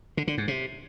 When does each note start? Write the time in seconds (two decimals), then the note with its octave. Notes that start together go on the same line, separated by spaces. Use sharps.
0.17 D3
0.27 D3
0.38 G#2
0.48 C3